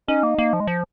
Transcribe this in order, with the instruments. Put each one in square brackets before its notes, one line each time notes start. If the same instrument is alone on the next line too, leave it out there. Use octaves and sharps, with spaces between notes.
[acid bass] C#4 [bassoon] D#4
[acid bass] A#3
A#3
F3
G#3
F3